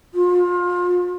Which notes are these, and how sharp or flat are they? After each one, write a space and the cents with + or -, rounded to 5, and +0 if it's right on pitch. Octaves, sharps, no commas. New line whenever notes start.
F4 +35